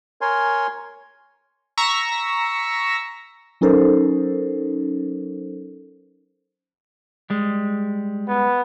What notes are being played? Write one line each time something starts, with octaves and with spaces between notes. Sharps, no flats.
A#4 C#5 G#5 C6
A#5 C#6 E6 A#6 B6
F#3 C#4 D#4 A4 A#4 C5
G3 G#3
B3